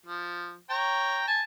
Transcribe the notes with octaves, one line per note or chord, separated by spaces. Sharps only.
F3
C#5 G5 A#5
G#5 A5